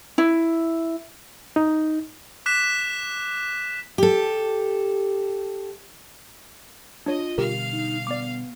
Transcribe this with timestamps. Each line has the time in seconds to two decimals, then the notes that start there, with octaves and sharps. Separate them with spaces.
0.18 E4
1.56 D#4
2.46 D6 F#6 B6 E7
3.98 G4 A4
7.06 D4 F4 C#5 D#5
7.38 B2 D3 G3 G4 A#4 F5 F6
7.72 D#4
8.07 B3 D5 D6